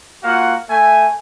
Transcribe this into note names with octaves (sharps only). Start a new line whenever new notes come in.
A#3 F4 F#4 F5 F#5
A3 E5 G#5